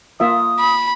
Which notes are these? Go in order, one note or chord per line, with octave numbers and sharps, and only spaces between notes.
A#3 F4 E5 D#6
B5